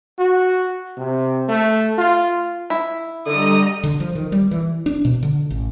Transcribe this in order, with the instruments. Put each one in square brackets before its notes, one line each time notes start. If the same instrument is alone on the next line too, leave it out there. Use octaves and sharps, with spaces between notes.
[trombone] F#4
C3
A3
F4
[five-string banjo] E4
[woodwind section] D3 [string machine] G3 D#5 A#5 [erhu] D#6
[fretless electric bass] D3
F3
D#3
G3
E3
D4
B2
D3
A1